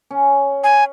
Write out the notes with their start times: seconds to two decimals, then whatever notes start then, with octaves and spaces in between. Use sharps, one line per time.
0.11 C#4
0.64 G#5